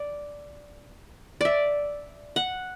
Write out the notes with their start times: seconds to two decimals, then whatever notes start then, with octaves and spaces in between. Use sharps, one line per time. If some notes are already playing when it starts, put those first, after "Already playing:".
Already playing: D5
1.41 D5 E5
2.36 F#5